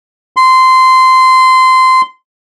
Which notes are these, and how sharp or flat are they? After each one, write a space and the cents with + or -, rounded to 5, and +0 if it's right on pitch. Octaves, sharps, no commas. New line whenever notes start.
C6 -15